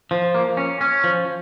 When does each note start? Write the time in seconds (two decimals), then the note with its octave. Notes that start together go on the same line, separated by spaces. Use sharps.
0.11 F3
0.35 A#3
0.57 C#4
0.81 C#4
1.04 F3